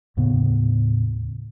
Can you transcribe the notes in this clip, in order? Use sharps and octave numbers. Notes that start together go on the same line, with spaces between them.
D#2 A2 C#3 B3